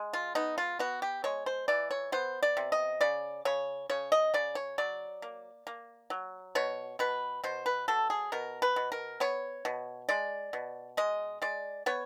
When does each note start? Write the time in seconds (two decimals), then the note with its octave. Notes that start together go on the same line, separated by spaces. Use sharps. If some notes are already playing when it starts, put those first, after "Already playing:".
Already playing: G#3
0.13 F4
0.35 B3 D#4
0.58 F4
0.79 B3 F#4
1.02 G4
1.24 G#3 C#5
1.46 C5
1.68 E3 D5
1.91 C#5
2.12 B3 C5
2.43 D5
2.57 C3
2.72 D#5
3.01 C#3 D5
3.45 C#3 C#5
3.90 C#3 C#5
4.12 D#5
4.34 C#3 D5
4.55 C#5
4.78 F#3 D5
5.22 A#3
5.67 A#3
6.10 F#3
6.55 B2 C#5
6.99 B2 B4
7.44 B2 C5
7.66 B4
7.88 F#3 A4
8.10 G#4
8.32 B2 A#4
8.62 B4
8.76 B2
8.92 A#4
9.20 B3 C#5
9.65 B2
10.09 G#3 D5
10.53 B2
10.97 G#3 D#5
11.42 G#3 D5
11.86 B3 C#5